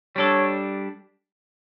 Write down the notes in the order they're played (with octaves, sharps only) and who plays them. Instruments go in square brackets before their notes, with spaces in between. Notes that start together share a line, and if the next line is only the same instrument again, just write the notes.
[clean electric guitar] G3 D4 A4 [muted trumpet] C#5